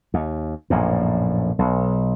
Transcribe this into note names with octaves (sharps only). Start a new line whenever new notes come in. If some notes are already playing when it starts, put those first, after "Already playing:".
D#2
A#1 F#2 A2
B1